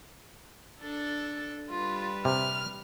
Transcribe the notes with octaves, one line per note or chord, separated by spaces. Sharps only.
D4 A4
G3 F4 B4
C3 F6